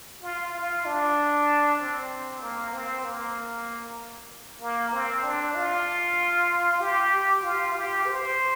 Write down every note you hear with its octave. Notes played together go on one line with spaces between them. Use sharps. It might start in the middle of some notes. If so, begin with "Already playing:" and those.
F4
F4
D4
C4
A#3
C4
A#3
A#3
C4
D4
F4
G4
F4
G4
C5